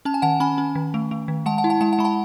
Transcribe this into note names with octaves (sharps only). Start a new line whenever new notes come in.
C#4 A5
G#5
D#3 F#5 A5
C#4 G#5 B5
C#4
D#3
A3
A3
D#3
G#3 F#5 A5
F#5 A5
E4
F#5 A5
G#3 F#5 A5
F#5 A5
G#3 B5
F#5 A5